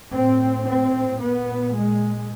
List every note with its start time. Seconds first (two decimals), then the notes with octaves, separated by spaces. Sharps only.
0.14 A2 C4
0.67 C4
1.20 A#2 B3
1.74 G#3